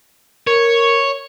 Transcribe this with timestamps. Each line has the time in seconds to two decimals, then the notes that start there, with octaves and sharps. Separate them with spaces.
0.47 A#4 C#5